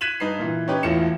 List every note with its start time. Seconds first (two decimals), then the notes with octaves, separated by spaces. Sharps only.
0.01 F#6 G#6 B6 D#7 E7 F#7
0.20 G2 D#4 B4 C7
0.39 A#2 E3
0.68 C#4 D#4 G4 B4
0.83 E1 A2 E3 F4 C#7 E7